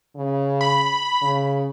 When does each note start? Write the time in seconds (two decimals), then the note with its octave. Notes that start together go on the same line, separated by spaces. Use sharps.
0.16 C#3
0.61 B5
1.22 C#3